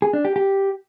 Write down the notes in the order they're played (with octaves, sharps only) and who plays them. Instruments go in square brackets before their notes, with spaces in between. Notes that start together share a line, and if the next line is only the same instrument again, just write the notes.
[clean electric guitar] G#4
D4
G4
G4